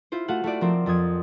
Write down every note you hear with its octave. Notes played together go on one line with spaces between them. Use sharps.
E4 F4 C5
A3 F4 F#4 F5 F#5
A3 E4 F#4 D5
F3 C4 A#4 C5
F2 F3 D#6 G#6